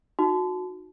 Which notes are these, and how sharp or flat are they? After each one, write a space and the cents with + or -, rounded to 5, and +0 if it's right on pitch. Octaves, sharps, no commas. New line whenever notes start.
D#4 +0 F#4 -15